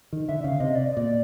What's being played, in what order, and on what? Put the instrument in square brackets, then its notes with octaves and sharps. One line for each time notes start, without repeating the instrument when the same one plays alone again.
[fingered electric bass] D#3
[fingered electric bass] D3 [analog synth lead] E5
[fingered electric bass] C#3 [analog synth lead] F5
[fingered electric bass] C3 [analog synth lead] D#5
[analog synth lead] D5
D#5
[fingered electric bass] A#2 [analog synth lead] D5